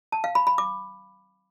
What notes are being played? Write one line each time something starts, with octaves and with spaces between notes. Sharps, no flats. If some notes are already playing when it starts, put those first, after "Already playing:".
A5
F5
B5
B5
D6